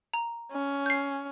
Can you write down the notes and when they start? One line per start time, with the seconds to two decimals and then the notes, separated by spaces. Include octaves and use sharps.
0.14 A#5
0.52 C#4
0.86 G6 C7